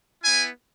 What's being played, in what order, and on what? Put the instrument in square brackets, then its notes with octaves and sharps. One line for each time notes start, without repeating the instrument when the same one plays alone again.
[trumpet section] B3 E4 G#5